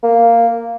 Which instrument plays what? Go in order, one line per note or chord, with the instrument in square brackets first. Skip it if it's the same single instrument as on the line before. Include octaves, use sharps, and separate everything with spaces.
[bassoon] A#3